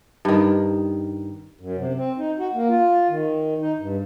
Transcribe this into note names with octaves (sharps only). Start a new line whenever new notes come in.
G2 D#3
F#2
C3
C4
D#4
F#4
A#3
F4
D#3
D#4
G2